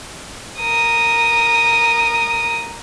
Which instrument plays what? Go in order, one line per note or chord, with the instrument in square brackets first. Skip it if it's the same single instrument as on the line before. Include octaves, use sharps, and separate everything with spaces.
[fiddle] A#4 D#6